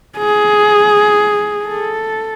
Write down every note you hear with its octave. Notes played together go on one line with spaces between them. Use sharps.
G#4
A4